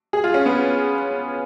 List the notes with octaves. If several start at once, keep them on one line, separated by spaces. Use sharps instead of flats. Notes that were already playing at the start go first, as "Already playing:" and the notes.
G#4
F4
C#4
B3